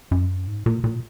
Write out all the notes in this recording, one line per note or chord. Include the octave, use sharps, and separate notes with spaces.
F#2
G#2
A#2
A#2